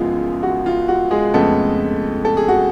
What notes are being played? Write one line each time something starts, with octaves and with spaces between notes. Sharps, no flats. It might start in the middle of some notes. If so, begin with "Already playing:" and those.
Already playing: F#1 F#2 F3 G#3 B3 F4
F#4
F4
F#4
G#3 G#4
F2 C#3 G#3 A3 B3 A4
A4
G#4
F#4